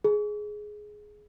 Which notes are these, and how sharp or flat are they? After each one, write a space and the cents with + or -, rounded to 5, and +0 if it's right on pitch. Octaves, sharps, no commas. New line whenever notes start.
G#4 +10